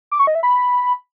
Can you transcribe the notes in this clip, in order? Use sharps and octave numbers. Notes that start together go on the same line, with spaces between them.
D6
C#6
D#5
E5
B5